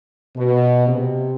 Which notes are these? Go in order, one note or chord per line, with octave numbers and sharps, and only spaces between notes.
B2
C3